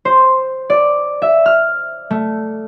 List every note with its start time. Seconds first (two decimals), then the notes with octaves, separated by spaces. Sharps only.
0.05 C5
0.70 D5
1.22 E5
1.46 F6
2.11 A3